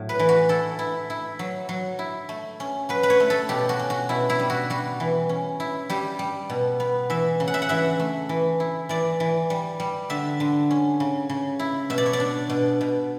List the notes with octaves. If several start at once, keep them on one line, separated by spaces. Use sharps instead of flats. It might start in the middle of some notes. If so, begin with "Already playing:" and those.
Already playing: A2 F#3
B4
E3
F#4
E4 A4
E4
E4
F#3
F#3
E4
A3
C#4
F#3 B4
B4
C#5
A3
A4
B2 G4
F#4
C#4
F#4
B2 E4
E4
G3
F#4
G3 F#4
E3
C#4
E4
G3 G4
G3
B2
B3
E3 E5
C#3
F#5
E5
F#5
E3 E5
A3
E3
E4
E3 D5
E3
G3
G3
D3 E5
D3
C#4
C#3
C#3
E4
B2 E5
D5
C#5
D5
D4
B2
B2